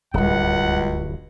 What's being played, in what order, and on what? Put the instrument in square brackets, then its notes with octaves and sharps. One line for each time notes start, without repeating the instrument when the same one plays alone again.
[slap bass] D1 G2 [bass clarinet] C#2 [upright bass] G3 G#3 [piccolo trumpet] F#5